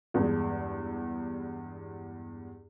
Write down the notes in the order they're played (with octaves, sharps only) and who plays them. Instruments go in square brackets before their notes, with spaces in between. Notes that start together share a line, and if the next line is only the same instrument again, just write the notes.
[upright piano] E2 G2 G#3